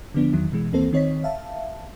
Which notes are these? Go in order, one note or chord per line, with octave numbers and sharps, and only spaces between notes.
D3 F3 B3 D4
E2 D#3 F#3
B2 E3 G#3
D#2 E3 A#3 C4 A4 C5
D#3 C4 C#5 D#5 B6
E5 F5 A5